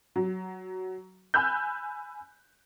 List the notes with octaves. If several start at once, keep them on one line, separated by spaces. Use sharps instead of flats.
F#3
G#5 B5 E6 F#6 G6